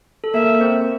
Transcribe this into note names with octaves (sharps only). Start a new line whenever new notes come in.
A4
A#3 A#4 E5
C4 C5